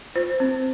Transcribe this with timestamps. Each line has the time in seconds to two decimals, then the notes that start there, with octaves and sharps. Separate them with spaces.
0.16 F4 C5
0.40 C4